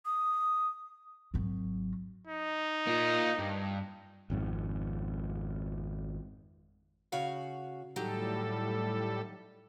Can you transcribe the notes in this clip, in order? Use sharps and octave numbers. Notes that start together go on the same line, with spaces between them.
D#6
G#1 F#3
D#4
A#3 F4
G2
G#1 F2 G#2
C#3 F#4 F5
A2 D#3 F#3 G3 G4 A4